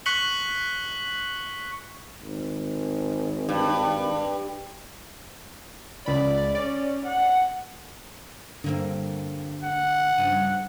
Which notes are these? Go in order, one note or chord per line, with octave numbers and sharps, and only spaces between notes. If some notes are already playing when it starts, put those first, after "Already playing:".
C#6 F#6 B6 C#7 F#7 G7
G#1
G2
C#2 D5 B5
C#4 D5
F#5
G2 D3 A#3 C4
F#5
G2 C#3 F3